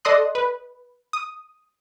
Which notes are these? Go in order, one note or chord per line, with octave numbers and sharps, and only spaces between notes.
A4 D5 D#5 C6 D#6 F#6
B4
D#6